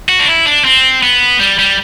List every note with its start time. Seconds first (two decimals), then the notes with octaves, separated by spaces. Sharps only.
0.09 F#4
0.19 D4
0.28 E4
0.46 D4
0.64 C4
1.03 B3
1.40 G3
1.59 G3